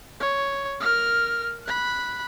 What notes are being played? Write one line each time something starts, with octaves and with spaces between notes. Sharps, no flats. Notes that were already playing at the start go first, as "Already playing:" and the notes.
C#5
A#4 F6
B5 F#6